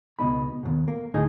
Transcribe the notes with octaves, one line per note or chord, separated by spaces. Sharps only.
C#2 B2 D#4 B5
D#2 G#2 B2
A#3
D2 A2 D#4 G#4